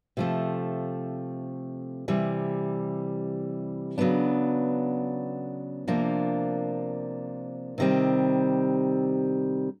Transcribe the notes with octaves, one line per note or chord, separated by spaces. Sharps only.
C3 F3 A3
C3 E3 G3
C#3 F#3 B3 D4
C3 F3 A#3 D4
C3 D#3 G3 C4